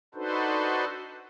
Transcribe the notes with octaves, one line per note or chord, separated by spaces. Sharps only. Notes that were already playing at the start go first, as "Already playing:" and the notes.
D4 D#4 F#4 A4 B4 C5